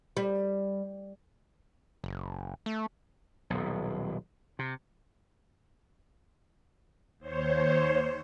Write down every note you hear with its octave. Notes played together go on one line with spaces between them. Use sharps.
G3
F#1
A3
D#1 B1
C3
D#2 C5 C#5